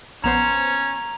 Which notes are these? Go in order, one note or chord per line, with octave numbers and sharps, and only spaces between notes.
A#1 B3 C#4 C5 A#5 F7